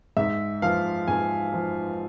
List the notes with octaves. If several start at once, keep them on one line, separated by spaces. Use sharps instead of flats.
G#2 E5
F3 F5
G#2 G#5
F3